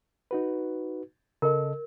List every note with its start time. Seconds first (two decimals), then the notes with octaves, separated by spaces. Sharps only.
0.31 D#4 F#4 B4
1.42 C#3 A4 A#4 D#5